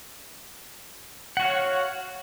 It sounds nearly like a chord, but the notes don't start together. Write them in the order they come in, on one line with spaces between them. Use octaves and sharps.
F#5 F#4 F5 C#5